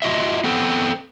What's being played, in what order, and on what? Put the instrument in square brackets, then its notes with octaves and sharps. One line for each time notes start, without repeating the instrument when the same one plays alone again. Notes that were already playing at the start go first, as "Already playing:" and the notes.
[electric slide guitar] F4 F#4 D#5 E5
B3 C4 A4